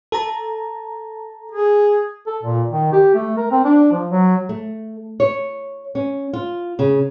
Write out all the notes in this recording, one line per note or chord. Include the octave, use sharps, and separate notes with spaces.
A4 A5 A#5
G#4
A4
A#2
D#3
G4
A3
A#4
C4
D4
F3
F#3
A3
C#5
C#4
F4
C#3